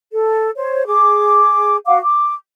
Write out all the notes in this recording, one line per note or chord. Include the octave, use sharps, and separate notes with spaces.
A4
C5 C#5
G#4 D6
F#4 F5 F#5 D6
D6